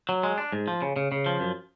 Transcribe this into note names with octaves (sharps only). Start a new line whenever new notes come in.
F#3
G#3
D4
G#2
F3
C#3
C#3
C#3
F3
F#2